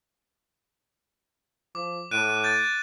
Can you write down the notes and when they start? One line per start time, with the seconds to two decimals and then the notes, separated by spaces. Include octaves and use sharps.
1.75 F3 D6
2.11 A2 F#6 D7 D#7
2.44 G6 A6